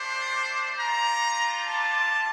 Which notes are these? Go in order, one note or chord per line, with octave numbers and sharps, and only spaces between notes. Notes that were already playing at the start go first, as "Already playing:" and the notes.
Already playing: A3 D4 G4 C5
G3 D4 F4 A#5
A5